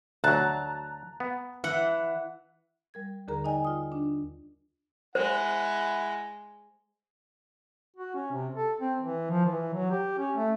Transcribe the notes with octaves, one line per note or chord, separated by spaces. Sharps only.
D2 F#3 A5 A#5 F#6
B3
E3 F#5
G3 A#4 G#6
D#2 D3 G#4 A#4 A#5
D#4 D5 D#5 G5 G#5
F4 D#6
D4
G#3 E4 C5 F#5
F#4
C#4
C3
A4
C4
E3
F3
E3
F#3
G4
C#4
A3